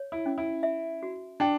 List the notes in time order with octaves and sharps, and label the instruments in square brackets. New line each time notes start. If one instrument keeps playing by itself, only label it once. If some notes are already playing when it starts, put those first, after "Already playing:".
Already playing: [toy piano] C#5
[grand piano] E4
[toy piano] C#4
[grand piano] E4
[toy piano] E5
F#4
[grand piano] D4 [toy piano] G5